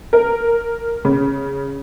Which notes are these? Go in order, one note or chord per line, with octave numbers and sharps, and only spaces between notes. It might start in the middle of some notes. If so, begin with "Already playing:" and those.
A#4
C#3